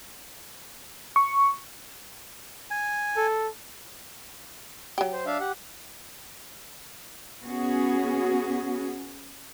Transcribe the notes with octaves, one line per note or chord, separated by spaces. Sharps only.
C#6
G#5
A4
F#3 G4
C5
D4 E5 F5
G4 F#5
B3 C#4 F#4 G#4